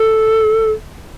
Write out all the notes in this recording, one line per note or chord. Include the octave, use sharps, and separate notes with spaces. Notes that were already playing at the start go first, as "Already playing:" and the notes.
Already playing: A4